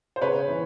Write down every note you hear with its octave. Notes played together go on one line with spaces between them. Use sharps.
C5
C#3 B4 C#5
E3